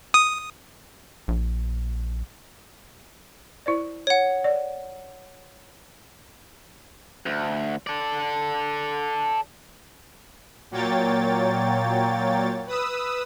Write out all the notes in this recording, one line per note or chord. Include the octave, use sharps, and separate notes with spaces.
D#6
A#1
E4 C5 D5
C#5 F#5
D5
D2
A4 D5
A#2 F#3 A#3 C#5 G5 A6
B4 D#6 E6